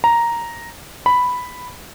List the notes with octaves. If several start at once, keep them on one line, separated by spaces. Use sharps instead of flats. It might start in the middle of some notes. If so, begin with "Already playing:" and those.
A#5
B5